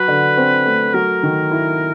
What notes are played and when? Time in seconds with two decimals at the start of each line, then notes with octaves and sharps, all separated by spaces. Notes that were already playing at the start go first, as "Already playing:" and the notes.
Already playing: F#3 B4
0.08 D3
0.37 C4
0.66 A3
0.94 F#3 A#4
1.23 D#3
1.51 E4